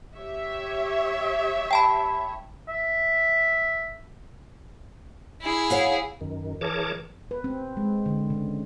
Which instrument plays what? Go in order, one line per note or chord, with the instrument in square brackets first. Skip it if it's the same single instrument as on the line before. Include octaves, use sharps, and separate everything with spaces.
[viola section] G4 C#5 E5
[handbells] G5 A5 B5
[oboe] E5
[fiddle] E4 G#4
[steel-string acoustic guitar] C#5 F5 F#5
[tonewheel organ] F#2 D#3
E3 G#4 A#4 C#5 A5 D6
[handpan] B4
C4
G#3
D3
C#3